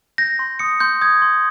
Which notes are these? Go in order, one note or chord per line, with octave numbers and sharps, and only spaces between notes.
G6 A#6
C6
D#6 C#7
C6 G6
D#6 G#6
C6